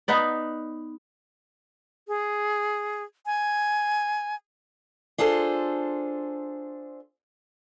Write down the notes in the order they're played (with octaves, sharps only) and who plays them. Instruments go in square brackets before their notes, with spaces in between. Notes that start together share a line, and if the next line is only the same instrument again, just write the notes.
[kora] B3 D#4 B4 D5
[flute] G#4
G#5
[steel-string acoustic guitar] D4 F4 G#4 A4 C5